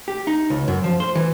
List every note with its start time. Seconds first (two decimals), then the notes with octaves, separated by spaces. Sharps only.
0.08 G4
0.27 D#4
0.50 C#2
0.68 F#2
0.84 F3
1.00 C5
1.15 E3